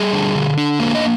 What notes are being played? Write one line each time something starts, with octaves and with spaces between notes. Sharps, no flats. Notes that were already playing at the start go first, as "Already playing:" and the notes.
Already playing: G3 G#4
D3
D3
D4
A#3 A#4
D#5